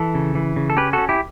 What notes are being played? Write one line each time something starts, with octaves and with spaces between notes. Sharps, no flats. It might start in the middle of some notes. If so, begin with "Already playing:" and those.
Already playing: E3 A4
C#3
E3
C#3
A4
C#4 G4 B4
C#4 F#4 A4
E4 G4